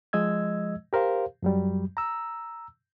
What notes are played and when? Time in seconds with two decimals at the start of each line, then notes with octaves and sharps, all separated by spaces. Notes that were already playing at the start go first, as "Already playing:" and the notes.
0.13 F3 G#3 D#5 E6 G#6
0.93 G4 A#4 C5 F5
1.43 F#2 F#3 G3
1.97 A#5 E6